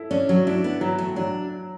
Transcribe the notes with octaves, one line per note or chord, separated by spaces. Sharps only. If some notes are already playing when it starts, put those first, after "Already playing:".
Already playing: E4 A4
C#4 D4
F#3
D4 E4
B3
E3 F#3
A2
F#3 D4